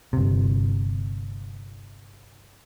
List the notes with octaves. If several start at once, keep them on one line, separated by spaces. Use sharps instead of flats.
G1 C3